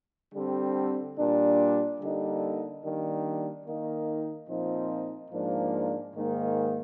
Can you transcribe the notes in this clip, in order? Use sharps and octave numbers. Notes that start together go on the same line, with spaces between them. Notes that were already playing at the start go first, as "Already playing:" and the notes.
D3 G3 C4
A#2 G3 D4
D3 G3 A#3 D#4
D#3 G3 A#3 D4
D#3 A#3 D#4
A#2 F3 C4 D#4
G#2 F3 A#3 D4
G#2 D#3 A#3 D#4